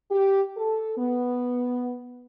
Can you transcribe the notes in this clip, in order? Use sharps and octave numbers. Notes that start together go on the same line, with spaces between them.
G4
A4
B3